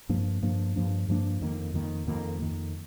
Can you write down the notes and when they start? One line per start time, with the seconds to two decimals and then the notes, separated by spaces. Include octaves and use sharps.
0.09 G2 F3 A#3 D4
0.43 G2 F3 A#3 D4
0.76 G2 F3 A#3 D4
1.09 G2 F3 A#3 D4
1.41 F2 D#3 A#3
1.74 F2 D#3 A#3
2.07 F2 D#3 A#3
2.39 F2 D#3 A#3